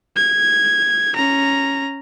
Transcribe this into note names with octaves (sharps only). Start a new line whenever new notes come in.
G#6
C#4 A#5